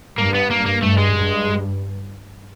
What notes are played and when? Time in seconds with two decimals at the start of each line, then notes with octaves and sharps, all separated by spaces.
0.18 G2 A#3
0.34 B3
0.51 A#3
0.66 A#3
0.82 G2 A3
0.98 G#3
1.14 G2